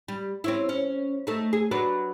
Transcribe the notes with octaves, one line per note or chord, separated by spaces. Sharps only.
G3
C4 C#4 E4
C#4
A3 D#4
G#4
F#3 D4 B4